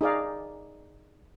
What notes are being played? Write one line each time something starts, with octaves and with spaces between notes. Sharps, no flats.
D#4 G#4 D5 F5